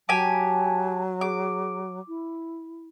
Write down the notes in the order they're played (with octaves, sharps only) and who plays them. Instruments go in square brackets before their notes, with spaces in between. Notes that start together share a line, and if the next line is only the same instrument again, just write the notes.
[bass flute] F#3 [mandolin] G4 G#5 [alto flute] A5
[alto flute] G#4 [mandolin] D6
[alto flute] E4